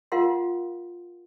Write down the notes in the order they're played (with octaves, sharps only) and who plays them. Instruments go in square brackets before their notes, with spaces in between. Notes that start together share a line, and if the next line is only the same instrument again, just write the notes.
[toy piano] F4 A#4 F5 F#5 C6